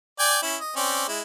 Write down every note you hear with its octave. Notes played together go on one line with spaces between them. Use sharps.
D5 G5 G#5
C#4 E4
D#5
C4 C#4 D5
G#3 E4